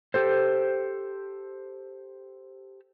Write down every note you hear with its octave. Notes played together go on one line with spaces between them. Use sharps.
G4 A4 C5